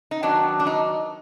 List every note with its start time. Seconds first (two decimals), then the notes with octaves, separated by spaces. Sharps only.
0.11 D#4
0.23 D#3 F#3 B3 D4
0.60 D4
0.67 D#4